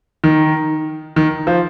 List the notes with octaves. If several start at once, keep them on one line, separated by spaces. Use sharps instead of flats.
D#3
D#3
F3